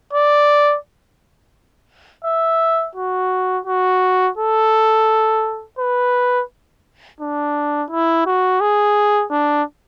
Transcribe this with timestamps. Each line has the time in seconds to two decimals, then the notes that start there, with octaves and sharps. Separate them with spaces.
0.13 D5
2.25 E5
2.96 F#4
3.66 F#4
4.37 A4
5.79 B4
7.20 D4
7.90 E4
8.26 F#4
8.61 G#4
9.31 D4